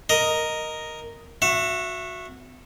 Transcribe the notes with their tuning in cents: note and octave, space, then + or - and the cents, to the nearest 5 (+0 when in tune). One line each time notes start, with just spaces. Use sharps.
A#4 +0 D#5 +0
F#4 -20 E5 +20